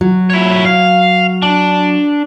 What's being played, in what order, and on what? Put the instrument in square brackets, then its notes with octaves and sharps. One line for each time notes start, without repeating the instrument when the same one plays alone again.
[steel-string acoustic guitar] F#3
[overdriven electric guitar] E4 C#5
F5
D4